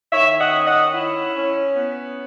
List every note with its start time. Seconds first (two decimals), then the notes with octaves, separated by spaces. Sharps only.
0.12 D#3 C#5 E5
0.39 D#5 F#5
0.53 C#4
0.67 D#5 F#5
0.94 E4
1.36 C#4
1.77 B3